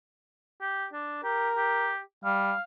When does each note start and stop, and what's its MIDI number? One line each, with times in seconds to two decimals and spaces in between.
0.61 0.86 67
0.93 1.19 62
1.23 1.49 67
1.23 1.90 70
1.56 1.99 67
2.25 2.53 55
2.25 2.62 77